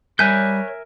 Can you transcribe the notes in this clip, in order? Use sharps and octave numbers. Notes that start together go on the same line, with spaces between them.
G3 A#4 C#5 E5 G#5 F#6 G6